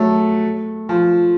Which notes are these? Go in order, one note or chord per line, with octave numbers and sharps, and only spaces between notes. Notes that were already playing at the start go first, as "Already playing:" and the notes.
Already playing: F#3 A3
F3